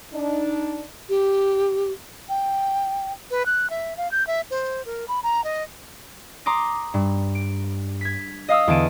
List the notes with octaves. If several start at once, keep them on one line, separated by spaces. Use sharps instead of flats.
D4 D#4
G4
G5
B4
F#6
E5
F5
G6
E5
C5
A#4
B5
A#5
D#5
A#5 C6 D6 D#6 A#6
G2
D7
G#6 B6
D#5 F5 D#6 E6
E2 D3 A5 D7 D#7